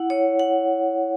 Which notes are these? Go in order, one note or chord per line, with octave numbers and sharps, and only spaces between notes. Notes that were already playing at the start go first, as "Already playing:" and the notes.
Already playing: E4 F#5
C#5
F#5